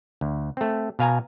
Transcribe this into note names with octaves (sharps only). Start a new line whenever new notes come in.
D2
A3 C4
B2 F5 G#5 A#5